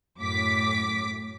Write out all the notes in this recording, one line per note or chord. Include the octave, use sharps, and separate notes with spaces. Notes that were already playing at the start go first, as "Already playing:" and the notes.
F#2 A2 D6 B6